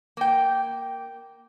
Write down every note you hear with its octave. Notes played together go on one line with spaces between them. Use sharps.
A#3 G5